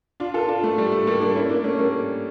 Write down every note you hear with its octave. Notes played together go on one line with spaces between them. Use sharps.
D4 F4
F4 A4
D4 F4
A3
G3
A3
G3 A#3
A#3 D4
C#4 E4
A#3 D4
A3 C#4
G3 A#3